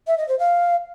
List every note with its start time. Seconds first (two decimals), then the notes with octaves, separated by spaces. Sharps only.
0.06 E5
0.17 D#5
0.28 C5
0.38 F5